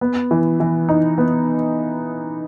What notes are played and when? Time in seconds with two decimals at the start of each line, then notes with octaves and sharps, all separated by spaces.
0.01 B3
0.31 E3
0.60 E3
0.89 D#4
1.18 B3